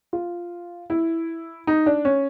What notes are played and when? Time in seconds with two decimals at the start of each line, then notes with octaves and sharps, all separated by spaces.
0.13 F4
0.90 E4
1.67 D#4
1.86 D4
2.05 C#4